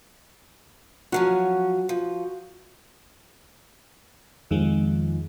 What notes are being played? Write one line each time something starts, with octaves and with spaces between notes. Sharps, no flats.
F3 F#3 C#4 F#4
F3
F2 D#3 F3 G#3